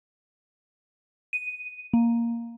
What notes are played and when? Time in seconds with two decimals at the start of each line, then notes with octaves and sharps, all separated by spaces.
1.33 D#7
1.93 A#3